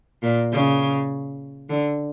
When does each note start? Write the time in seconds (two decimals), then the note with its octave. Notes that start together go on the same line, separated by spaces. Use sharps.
0.23 A#2
0.52 C#3
1.69 D3